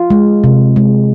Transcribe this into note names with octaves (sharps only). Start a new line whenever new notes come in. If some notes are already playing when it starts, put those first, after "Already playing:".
Already playing: F4
G#3
C3
G#3